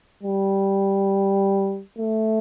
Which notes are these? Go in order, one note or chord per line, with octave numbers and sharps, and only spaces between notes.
G3
A3